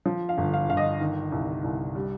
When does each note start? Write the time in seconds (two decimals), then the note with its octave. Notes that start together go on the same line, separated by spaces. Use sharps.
0.06 F3
0.29 F5
0.38 G1
0.54 F5
0.69 G1 F5
0.77 D#5
1.01 D#3
1.32 C2
1.64 C2
1.95 G3